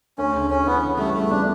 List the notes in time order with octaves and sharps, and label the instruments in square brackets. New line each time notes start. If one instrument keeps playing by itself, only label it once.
[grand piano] D2 [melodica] C#4
[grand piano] C#3
[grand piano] D2 [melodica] C#4
[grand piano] E3 [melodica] B3
[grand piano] C#3 [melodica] B3
[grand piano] G3 [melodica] A3
[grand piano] C#3 [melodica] A3
[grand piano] B3 [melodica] D4